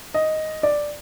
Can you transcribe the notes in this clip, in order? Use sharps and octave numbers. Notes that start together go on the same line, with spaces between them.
D#5
D5